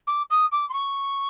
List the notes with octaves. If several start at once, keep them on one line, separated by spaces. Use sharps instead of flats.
D6
D#6
D6
C6
C#6